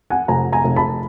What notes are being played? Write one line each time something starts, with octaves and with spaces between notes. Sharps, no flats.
F#5 G#5
F1 G#5 A#5
G#5 A#5
F1
A5 B5